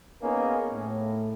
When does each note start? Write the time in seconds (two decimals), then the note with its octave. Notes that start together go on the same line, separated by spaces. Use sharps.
0.22 A#3 B3 C#4 D#4 G#4 A#4
0.73 A2